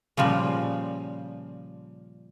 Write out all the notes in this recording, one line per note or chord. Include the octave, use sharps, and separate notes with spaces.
A#2 C#3 F3 G3